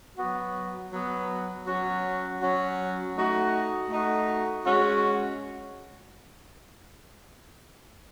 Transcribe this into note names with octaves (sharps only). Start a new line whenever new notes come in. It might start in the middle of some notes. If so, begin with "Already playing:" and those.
F#3 B3 F#4
F#3 B3 F#4
F#3 C#4 F#4
F#3 C#4 F#4
A3 D#4 F#4
A3 D#4 F#4
G#3 C#4 F#4